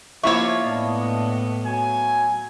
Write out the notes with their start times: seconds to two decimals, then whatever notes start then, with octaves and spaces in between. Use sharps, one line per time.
0.23 F3 A#3 E4 F4 C#5 E5 C#6
0.64 A2 B3 D4 D#5
1.65 F#3 G#5